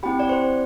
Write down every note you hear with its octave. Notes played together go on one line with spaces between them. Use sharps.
C4 E4 G4 G5 B5
D5
C5